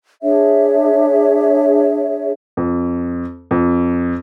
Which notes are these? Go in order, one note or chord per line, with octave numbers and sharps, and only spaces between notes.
D4 G#4 C#5 E5
F2
F2